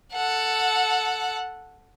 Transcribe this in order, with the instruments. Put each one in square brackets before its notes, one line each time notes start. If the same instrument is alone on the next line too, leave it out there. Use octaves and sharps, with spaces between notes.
[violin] A4 F#5